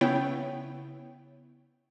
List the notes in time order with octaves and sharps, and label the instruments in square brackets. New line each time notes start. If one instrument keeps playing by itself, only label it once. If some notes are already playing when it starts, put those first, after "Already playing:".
[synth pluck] C#3 B3 E4 C#5 G5